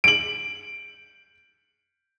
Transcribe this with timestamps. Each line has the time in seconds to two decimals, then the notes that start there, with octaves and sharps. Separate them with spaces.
0.04 D7 F#7